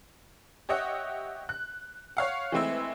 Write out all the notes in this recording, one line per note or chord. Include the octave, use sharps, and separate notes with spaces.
G4 C#5 D#5 E5 F#5
F#6
C#5 F5 F#5
E3 G#3 A3 C4 E4 E5